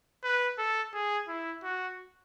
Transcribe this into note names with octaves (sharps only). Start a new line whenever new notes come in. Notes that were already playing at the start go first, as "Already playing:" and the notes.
B4
A4
G#4
E4
F#4